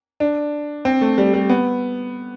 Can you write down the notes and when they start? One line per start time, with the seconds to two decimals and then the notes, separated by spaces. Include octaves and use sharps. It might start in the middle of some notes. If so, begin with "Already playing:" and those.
0.20 D4
0.85 C4
1.01 A3
1.18 G3
1.34 G3
1.49 B3